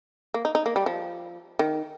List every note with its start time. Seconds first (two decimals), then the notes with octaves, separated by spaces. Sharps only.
0.34 A#3
0.45 D#4
0.55 D#4
0.66 A#3
0.76 G3
0.86 F3
1.59 D#3